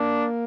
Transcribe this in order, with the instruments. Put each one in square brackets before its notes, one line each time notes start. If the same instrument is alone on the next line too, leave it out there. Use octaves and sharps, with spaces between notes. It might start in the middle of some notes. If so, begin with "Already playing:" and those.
Already playing: [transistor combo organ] A#3 [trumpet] D4